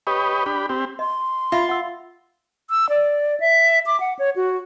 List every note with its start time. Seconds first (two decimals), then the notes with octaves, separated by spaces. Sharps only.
0.07 G4 B4 C#5 D#5
0.46 D4 G4 B5
0.69 C4 G4
0.99 D#5 C6
1.52 F4 E5 B5
1.69 F#5 E6
2.70 E6
2.89 D5
3.40 E5
3.86 D6
4.00 F#5
4.19 C#5
4.36 F#4